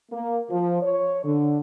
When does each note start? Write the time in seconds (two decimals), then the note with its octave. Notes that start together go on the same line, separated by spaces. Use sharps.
0.11 A#3
0.50 F3
0.82 C#5
1.23 D3